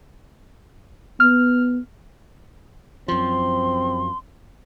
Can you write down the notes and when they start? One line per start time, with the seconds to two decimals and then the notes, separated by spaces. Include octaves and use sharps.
1.20 B3 F6
3.08 F#2 F3 C4 C6